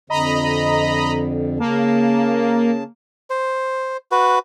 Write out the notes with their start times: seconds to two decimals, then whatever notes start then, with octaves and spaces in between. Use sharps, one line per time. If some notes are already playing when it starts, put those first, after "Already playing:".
0.10 F2 D3 D#5 A#5 B5
1.60 C#3 A#3 A5
3.30 C5
4.12 F#4 B4